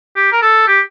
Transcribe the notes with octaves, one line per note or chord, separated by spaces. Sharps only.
G4
A#4
A4
G4